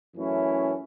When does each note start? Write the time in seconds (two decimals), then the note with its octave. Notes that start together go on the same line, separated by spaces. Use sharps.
0.15 F#2 E3 A3 C#4 E4